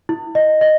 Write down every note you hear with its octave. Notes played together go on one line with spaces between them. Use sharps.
E4
D#5
D#5